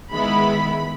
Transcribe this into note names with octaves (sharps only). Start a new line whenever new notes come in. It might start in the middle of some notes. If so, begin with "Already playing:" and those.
D#3 G#3 B3 E4 B5